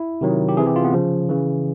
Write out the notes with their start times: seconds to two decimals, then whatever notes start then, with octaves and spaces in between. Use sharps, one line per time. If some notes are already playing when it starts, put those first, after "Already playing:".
Already playing: E4
0.21 C3 D#3 F#3
0.49 G4
0.57 C3 E3 G#4
0.67 G4
0.76 F4
0.85 B3
0.93 C#3 F3
1.29 C#3 E3